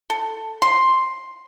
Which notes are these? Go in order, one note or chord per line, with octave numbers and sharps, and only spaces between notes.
A4
C6